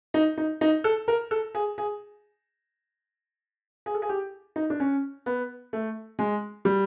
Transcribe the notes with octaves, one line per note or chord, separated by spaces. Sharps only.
D#4
D#4
D#4
A4
A#4
A4
G#4
G#4
G#4
A4
G#4
G4
D#4
D4
C#4
B3
A3
G#3
G3